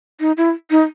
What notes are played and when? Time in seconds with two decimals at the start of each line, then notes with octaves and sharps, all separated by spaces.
0.20 D#4
0.37 E4
0.71 D#4